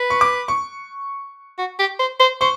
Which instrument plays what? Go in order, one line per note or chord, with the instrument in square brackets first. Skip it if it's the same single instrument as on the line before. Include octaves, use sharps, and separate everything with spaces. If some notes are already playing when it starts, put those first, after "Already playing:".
Already playing: [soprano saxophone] B4
[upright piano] C#6
D6
C#6
[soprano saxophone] F#4
G4
C5
C5
[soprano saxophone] C5 [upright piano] C#6